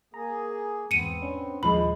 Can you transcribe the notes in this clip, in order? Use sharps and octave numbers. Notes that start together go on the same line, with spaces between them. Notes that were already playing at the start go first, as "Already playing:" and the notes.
A#3 G#4 A#5
E2 G#2 B3 C4 C#7 D#7
C#4 D4
D#2 A#2 F3 G#3 B5